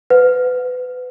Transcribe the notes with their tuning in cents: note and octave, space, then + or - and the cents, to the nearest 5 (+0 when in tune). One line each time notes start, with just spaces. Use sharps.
B4 +25 F#5 -30